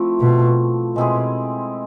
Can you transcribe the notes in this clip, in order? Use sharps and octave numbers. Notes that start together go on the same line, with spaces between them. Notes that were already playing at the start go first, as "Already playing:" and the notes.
Already playing: F3 A3 C4 E4
B2
B2 G#3 C4 E4 G#4